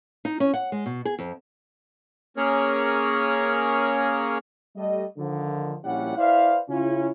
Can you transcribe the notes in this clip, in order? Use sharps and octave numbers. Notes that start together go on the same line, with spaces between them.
D#4
C#4
F#5
G#3
B2
G#4
F2
A#3 C#4 G#4 A#4 C#5
G3 A3 D#5
D3 D#3 F3
A#1 A#2 G3 C#4 E4 F#5
E4 B4 C5 D5 E5 F5
C#3 C#4 E4 F4